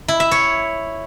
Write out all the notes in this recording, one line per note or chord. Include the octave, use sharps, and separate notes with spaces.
E4
E5
C#5